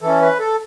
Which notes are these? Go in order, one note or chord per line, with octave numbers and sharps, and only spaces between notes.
E3 C#4 A4
B4
A4